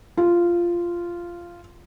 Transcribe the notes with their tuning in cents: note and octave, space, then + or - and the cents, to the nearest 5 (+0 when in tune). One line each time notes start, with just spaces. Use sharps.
F4 -10